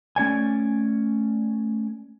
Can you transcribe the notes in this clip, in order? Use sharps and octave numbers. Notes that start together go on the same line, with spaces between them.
A3 C#4 D5 G#5